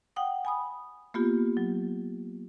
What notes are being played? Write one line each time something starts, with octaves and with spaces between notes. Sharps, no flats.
F#5 G5 D#6
G#5 B5 D#6
A#3 B3 F4 G4
F#3